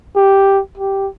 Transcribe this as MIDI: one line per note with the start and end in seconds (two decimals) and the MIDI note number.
0.16 0.61 67
0.78 1.08 67